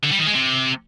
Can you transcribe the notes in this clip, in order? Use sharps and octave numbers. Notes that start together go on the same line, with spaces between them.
D3
G3
D#3
G#3
C3